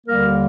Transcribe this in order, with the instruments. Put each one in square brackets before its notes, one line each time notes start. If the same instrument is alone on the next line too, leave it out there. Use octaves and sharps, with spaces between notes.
[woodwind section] D#2 D3 G3 A#3 A#4